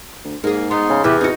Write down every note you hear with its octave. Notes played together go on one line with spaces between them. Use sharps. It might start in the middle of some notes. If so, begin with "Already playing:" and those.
D2
G#2 A#3 G#4
B3 D#4 C6
C#3
E2 C3 E4 G4 B4
C3 D#4 F#4 D#5